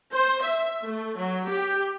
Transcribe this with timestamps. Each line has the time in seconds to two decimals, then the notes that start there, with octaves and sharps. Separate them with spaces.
0.13 C5
0.43 E5
0.84 A3
1.18 F#3
1.48 G4